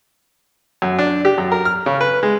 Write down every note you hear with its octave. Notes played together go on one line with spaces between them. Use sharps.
F#2
D4
G4
F#2
A#4
F6
C#3
B4
G#3